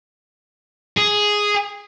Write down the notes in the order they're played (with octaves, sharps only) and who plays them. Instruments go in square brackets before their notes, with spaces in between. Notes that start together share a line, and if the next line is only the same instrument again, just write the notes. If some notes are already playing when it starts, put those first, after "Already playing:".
[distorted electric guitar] G#4